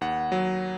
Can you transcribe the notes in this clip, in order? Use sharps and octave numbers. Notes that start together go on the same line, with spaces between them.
D#2 F#5
F#3